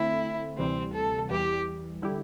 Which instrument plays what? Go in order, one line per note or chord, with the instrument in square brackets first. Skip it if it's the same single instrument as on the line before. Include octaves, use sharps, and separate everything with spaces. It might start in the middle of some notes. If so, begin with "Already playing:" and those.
Already playing: [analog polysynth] D3 A3 C4 [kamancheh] E4
[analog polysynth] D2 C3 E3 G3 [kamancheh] C4
[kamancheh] A4
[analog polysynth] E2 E3 G3 [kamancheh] G4
[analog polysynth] D3 G3 E4 G4